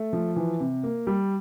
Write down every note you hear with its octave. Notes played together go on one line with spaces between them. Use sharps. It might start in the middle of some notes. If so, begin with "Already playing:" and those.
Already playing: A3
F3
E3
C3
A#3
G3